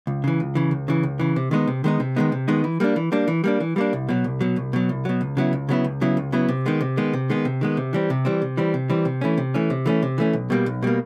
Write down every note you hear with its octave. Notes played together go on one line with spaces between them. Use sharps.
C#2
C#3 E3
C#2
C#3 E3
C#2
C#3 E3
C#2
C#3 E3
C3
D#3 G#3 B3 D#4
C3
D#3 G#3 B3 D#4
C3
D#3 G#3 B3 D#4
C3
D#3 G#3 B3 D#4
E3
G3 A#3 D4
E3
G3 A#3 D4
E3
G3 A#3 D4
E3
G3 A#3 D4
C2
B2 F#3
C2
B2 F#3
C2
B2 F#3
C2
B2 F#3
C#2
C#3 F#3 B3 E4
C#2
C#3 F#3 B3 E4
C#2
C#3 F#3 B3 E4
C#2
C#3 F#3 B3 E4
C3
D#3 G#3 B3
C3
D#3 G#3 B3
C3
D#3 G#3 B3
C3
D#3 G#3 B3
C3
E3 G3 C4
C3
E3 G3 C4
C3
E3 G3 C4
C3
E3 G3 C4
C3
E3 A3 C#4
C3
E3 A3 C#4
C3
E3 A3 C#4
C3
E3 A3 C#4
B1
B2 G3 A#3
B1
B2 G3 A#3